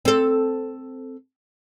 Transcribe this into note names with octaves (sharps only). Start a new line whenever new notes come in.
C4 A4